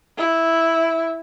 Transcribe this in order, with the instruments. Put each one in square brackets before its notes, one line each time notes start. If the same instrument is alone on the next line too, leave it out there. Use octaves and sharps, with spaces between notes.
[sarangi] E4